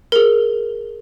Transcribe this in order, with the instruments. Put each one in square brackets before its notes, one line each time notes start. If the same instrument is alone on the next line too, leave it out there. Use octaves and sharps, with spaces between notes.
[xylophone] G#4 A#4